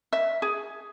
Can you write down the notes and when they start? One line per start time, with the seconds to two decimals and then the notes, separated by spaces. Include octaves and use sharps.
0.13 E5
0.42 G#4